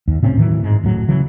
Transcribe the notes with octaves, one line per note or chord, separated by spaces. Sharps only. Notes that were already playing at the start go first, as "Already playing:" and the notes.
D#2
A2 C3 C4 C#4
A2 D#3 E3 F#3
G#2 G#3
D#1 A2 F#3
C#3 E3 F#3